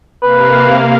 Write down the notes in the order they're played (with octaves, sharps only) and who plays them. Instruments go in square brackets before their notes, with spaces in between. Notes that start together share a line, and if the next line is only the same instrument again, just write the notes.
[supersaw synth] C3 A#3 F5 [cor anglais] B4